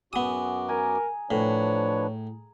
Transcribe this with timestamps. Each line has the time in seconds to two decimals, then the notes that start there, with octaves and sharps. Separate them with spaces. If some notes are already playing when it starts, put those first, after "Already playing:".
0.13 F#2 B3 F#4 G#4 D6 D#6
0.68 A#4 G#5 A#5
1.31 A2 F3 D4 B4 C#5